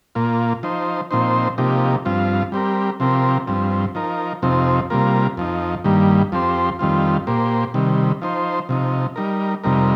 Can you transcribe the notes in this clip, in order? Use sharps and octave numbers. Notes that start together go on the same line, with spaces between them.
A#2 A#3 F4
F3 D#4 C5
A#2 F3 C4 D#4 C5
C3 F3 A#3 D#4 G4
G2 F3 C4 F4
G3 C4 G4 A#4
C3 F3 C4 G4 A#4
G2 F3 C4
F3 D#4 A#4
F2 C3 F3 C4 D#4
C3 G3 A#3 F4 A#4
F2 F3 D#4
G2 D#3 G3 A#3
F2 F3 C4 G4 C5
F2 D#3 G3 C4 F4
A#2 A#3 G4 C5
C3 D#3 G3
F3 D#4 C5
C3 F3 D#4
G3 D#4 A#4
F2 C3 G3 D#4 A#4